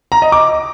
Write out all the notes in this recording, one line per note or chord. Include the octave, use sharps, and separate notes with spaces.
A#5
D#5
D6